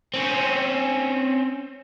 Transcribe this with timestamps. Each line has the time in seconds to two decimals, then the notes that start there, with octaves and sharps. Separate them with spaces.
0.14 C4 C#4